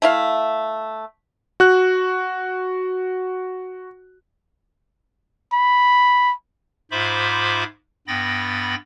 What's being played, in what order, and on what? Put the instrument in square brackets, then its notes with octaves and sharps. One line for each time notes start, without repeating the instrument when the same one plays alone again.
[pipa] A3 E4 F5
[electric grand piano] F#4 F#6
[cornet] B5
[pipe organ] G#2 F4 C5 E5 B5 D6
G2 B3 G5 B5 A6 A#6